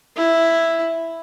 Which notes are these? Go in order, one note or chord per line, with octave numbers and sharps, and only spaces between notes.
E4